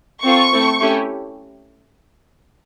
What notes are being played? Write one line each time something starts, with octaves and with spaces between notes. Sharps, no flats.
C4 F4 A4 C#6
A3 C4 E4 A4
A3 C#4 E4 G4